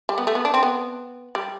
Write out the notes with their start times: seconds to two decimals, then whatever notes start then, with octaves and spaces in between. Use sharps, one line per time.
0.09 G3
0.18 B3
0.27 A3
0.35 B3
0.45 D4
0.54 C4
0.63 B3
1.35 G3